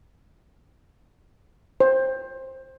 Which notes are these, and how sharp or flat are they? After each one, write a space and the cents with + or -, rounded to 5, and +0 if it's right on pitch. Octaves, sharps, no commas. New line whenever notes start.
C5 +15